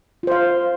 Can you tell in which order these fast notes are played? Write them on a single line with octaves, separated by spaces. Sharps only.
F4 C5 F5